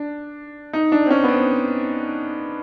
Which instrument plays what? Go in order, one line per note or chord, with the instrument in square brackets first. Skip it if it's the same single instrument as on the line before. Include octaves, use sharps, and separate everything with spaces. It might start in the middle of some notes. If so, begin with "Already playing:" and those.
Already playing: [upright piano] D4
D#4
D4
C4
C#4
B3
C4